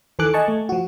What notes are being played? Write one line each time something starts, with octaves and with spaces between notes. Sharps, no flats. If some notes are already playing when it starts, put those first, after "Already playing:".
D#3 E3 A4 G#5 D6 F#6
D#5 G#5 A5 C#6
A3
F3 F#4